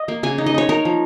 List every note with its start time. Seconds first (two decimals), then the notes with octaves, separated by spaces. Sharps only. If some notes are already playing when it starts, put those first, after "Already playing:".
Already playing: D#5
0.08 A#3
0.23 C#3 G#5
0.38 D#4
0.46 D#5
0.54 D#4 C#5
0.69 D#4 A#4
0.85 F3